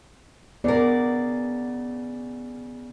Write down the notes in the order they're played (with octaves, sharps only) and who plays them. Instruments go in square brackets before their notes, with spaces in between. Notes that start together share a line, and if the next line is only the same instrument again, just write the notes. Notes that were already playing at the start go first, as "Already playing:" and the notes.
[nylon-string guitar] C#3 A#4 [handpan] B3 D5